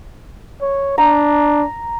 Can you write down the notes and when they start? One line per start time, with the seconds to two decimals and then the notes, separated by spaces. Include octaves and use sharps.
0.62 C#5
0.98 D4 A#5